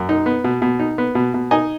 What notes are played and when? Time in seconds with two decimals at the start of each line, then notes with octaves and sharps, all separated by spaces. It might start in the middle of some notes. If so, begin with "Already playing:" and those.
Already playing: F#2
0.09 D#4
0.26 B3
0.44 B2
0.62 B2
0.79 D#4
0.98 B3
1.15 B2
1.34 B2
1.51 D#4 D#5 G#5